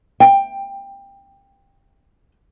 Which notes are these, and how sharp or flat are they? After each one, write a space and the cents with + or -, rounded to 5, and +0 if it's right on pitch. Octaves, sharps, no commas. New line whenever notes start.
G5 +15